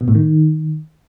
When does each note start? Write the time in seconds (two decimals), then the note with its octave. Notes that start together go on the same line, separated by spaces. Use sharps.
0.01 B2
0.08 A2
0.15 D#3